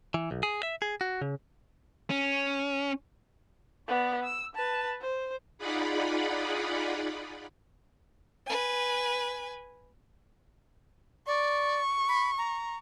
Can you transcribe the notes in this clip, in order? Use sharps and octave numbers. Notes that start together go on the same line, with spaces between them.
E3
B1
G#4
E5
G#4
F#4
C#3
C#4
B3 D5
E6
B4 A5
C5
D#4 F4 G#4 D5 F#5 B5
B4 G#5
D5 C#6
B5
A#5